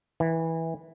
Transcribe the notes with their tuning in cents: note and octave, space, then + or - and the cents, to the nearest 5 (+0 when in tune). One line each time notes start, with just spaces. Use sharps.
E3 -15